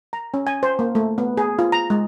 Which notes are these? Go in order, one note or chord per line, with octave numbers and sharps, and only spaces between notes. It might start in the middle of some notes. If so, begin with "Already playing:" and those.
A#5
C#4
G#5
C5
A#3
A3
B3
G#4
F4
A#5
G#3